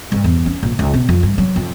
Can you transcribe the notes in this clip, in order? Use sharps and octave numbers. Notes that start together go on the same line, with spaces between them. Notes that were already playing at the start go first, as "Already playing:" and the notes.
G2
E2
C#4
A#1
C#2
B2
F2
G2
F#3
F2